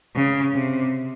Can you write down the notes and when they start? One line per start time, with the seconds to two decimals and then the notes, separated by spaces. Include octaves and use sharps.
0.16 C#3
0.55 C3